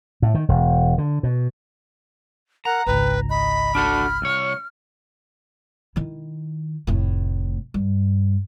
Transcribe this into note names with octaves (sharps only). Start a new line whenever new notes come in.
A2
D#3
E1
D3
B2
A#4 F#5 A#5
G#1 C#2 B4 G5
D#5 B5
D4 F#4 A4 F6
C2 C#5
D#3 E4
F1 A2
G2